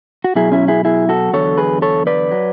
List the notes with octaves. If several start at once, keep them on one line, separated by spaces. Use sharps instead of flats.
F#4
B2 F#3 E4 G#4
C#4 E4
E4 G#4
E4 G#4
F#4 A4
E2 D3 F#3 A4 C#5
G#4 B4
A4 C#5
B4 D5
F#3